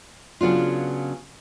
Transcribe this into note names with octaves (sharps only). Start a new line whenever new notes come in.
C#3 F#3 B3 D4 F4